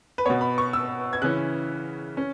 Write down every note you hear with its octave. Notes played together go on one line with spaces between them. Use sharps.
B4
B2 B3 C#5
B5
C#6
E6
G#6
C#3 E3 C#4 F#6
C#4